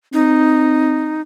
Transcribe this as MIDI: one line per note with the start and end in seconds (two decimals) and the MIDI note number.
0.13 1.22 60
0.13 1.21 63